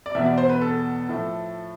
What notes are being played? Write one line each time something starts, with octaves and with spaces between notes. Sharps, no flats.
D5
E2 B2 B3 E5
D5
C5
B4
A4
A2 F3 A3